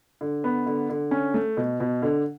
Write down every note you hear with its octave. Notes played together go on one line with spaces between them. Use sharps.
D3
B3
D3
D3
C#4
A3
B2
B2
D3